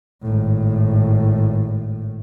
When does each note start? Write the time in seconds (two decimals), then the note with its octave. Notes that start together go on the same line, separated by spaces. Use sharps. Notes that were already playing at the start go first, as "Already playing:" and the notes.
0.23 G#1 A2